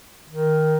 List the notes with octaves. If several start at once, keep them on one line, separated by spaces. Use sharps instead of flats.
D#3